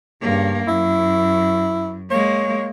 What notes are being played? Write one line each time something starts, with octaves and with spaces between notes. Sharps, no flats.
G2 C#3 A#3
F#2 E4
G#3 A#3 C#5